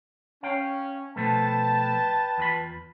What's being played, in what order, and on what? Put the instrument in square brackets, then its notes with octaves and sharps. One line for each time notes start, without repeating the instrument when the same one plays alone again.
[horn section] C#4 [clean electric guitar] F5 G5
[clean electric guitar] B2 F3 A3 [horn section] B4 G5 A5
[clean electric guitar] E2 F4 B5